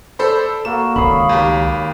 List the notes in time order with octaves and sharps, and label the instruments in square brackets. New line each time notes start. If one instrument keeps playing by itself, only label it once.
[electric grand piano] A4 C5 B5 [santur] D5
[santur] A#3 F#4 A4 [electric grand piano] E7
[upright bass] C#2 D#3 [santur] A#3 C#5 D#6 [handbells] F5 B5
[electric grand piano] D#2 G4